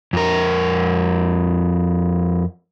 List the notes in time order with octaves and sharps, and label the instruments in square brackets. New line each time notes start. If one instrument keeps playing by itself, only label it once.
[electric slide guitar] F2 A#4